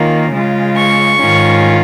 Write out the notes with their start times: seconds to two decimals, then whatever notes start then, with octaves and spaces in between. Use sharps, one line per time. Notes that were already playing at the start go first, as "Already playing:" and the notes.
Already playing: D#3 A#3 C#4 F4
0.33 C#3 G#3 F4
0.77 C#6
1.20 G#2 D#3 C#4 F4